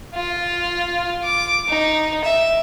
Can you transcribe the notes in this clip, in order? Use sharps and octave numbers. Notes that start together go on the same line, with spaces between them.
F4
D6
D#4
E5